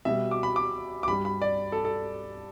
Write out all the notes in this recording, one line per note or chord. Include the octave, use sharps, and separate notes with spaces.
B2 G3 E5
D6
B5
D6
D6
G2 G3 B5
B5
D5
A4
A4